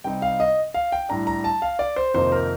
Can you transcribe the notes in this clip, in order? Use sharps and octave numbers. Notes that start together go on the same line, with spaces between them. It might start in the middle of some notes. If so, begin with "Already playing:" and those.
C3 G3 C4 D#4 G5
F5
D#5
F5
G5
A2 G3 D4 A#5
A#5
A5
F5
D5
C5
F2 C3 D#3 A#3 D#4 C5
A#4